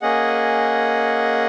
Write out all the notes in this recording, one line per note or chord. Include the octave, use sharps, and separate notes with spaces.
A#3 C#4 G#4 D#5 F#5